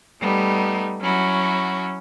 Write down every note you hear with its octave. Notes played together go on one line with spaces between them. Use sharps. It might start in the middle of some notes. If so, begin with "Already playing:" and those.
G3 A3 B3 D#4
F#3 C#4 E4 F#4